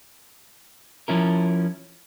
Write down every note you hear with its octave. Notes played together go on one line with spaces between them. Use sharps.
F3 C#4 E4 A#4